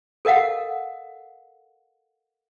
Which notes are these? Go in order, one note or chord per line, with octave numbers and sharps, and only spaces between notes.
A4 A#4 D#5 F5 F#5